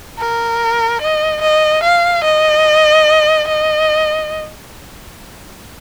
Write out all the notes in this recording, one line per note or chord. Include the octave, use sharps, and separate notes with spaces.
A#4
D#5
D#5
F5
D#5
D#5